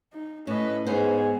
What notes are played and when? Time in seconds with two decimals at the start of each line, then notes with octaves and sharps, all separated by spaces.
0.13 D#4
0.47 A2 C#4 B4 D#5
0.87 G#2 B3 C#4 G#4 B4 C5